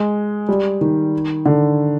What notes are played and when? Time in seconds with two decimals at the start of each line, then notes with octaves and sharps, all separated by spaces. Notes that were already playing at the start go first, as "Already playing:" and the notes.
Already playing: G#3
0.49 G3
0.81 D#3
1.46 D3